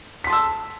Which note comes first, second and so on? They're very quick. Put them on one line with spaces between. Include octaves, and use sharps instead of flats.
B6 C6 A5 E6